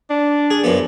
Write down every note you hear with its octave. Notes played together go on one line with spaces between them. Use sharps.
D4
G#4
F#2 F3 B3